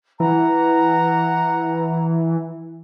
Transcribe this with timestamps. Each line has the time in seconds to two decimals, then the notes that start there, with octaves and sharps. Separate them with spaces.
0.20 E3 F#5 A#5